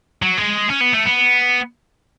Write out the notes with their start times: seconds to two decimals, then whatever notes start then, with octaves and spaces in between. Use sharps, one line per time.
0.22 F#3
0.38 G#3
0.70 C#4
0.81 B3
0.93 A3
1.05 B3